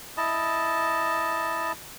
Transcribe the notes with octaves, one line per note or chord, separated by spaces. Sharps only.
E4 D#5 A5